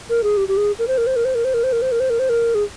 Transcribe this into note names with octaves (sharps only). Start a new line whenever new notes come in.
A#4
G#4
G4
G4
G#4
A#4
C5
A#4
C5
A#4
C5
A#4
C5
A#4
C5
A#4
C5
A#4
C5
A#4
C5
A#4
G#4